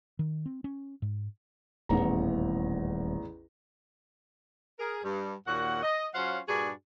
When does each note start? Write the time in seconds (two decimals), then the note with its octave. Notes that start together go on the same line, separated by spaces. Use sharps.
0.19 D#3
0.46 C4
0.64 C#4
1.02 G#2
1.89 D#1 A1 E2 A#5
4.80 G#4 A#4
5.04 G2
5.47 D#2 A#2 F#4 F#5
5.83 D#5
6.14 F#3 C#4 F4 C5 F5 F#5
6.49 G2 A#2 D4 F#4 G#4